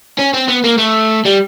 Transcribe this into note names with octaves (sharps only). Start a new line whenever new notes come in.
C#4
C4
B3
A#3
A3
G3